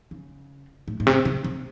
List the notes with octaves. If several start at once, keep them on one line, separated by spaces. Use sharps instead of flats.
C#3
A2
A2
C3
C3
C3